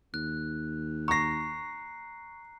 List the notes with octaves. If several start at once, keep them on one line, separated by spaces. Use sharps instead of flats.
D#2 F#6
A#5 C#6 A#6 C7